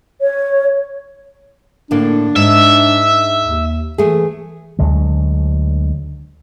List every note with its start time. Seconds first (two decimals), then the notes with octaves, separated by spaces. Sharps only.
0.22 C#5
1.91 A2 D3 A#3 D4
2.36 G#2 E5
3.42 D#2
3.98 E3 A3 G#4
4.79 D2 D3 F#3 G#3